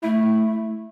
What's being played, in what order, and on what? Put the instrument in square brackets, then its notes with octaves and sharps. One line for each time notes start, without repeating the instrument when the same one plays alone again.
[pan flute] A3 [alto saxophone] E4